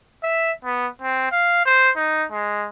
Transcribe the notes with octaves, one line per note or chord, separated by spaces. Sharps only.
E5
B3
C4
F5
C5
D#4
G#3